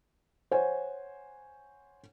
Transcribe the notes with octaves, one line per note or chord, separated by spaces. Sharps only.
C5 C#5 F#5 G#5